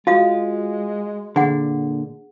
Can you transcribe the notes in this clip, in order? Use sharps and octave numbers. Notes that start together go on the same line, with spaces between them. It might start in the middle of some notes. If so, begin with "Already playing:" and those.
G#3 F4 F#4 F5 D#6
A#2 D3 G#4 F#5